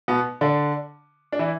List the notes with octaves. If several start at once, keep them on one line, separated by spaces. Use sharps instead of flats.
B2 B3
D3 D4
D4
E3 E4